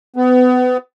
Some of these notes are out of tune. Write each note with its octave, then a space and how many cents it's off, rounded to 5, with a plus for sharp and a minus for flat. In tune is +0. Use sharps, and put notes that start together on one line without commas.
B3 +30